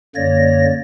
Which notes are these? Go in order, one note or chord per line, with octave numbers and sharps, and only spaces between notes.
F#2 D3 A#3 C#5 D5 A#6